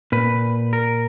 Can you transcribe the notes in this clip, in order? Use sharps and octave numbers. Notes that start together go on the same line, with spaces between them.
A#2 B4
A#4